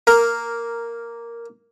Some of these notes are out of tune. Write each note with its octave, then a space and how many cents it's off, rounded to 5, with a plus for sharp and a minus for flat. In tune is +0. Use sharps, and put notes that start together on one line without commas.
A#3 +0 A#4 -5